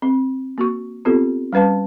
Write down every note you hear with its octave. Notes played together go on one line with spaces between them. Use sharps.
C4
A#3 F#4 C#6
B3 C4 F4 G4 A4
G3 C#4 B4 F5 A5